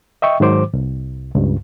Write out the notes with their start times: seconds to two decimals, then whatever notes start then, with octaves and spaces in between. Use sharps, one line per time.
0.22 D#5 E5 G5 C#6
0.40 G#2 D#3 F#3 C5 D6
0.73 C2
1.35 C#2 G2